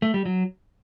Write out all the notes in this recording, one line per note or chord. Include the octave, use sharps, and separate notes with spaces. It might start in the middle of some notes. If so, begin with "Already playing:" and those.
A3
G3
F#3